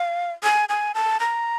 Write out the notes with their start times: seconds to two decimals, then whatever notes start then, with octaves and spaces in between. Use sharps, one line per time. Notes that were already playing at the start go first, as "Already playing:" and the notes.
Already playing: F5
0.43 G#5
0.69 G#5
0.94 A5
1.20 A#5